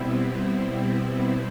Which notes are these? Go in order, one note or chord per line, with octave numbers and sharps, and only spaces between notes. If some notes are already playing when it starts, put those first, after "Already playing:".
Already playing: B2 G3 B3 C4 E4